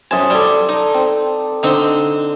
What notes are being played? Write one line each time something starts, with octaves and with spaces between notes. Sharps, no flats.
F#2 C5 G#5 A5 D#6
G3 A4 D5
D#4
C4
D3 C4 D#4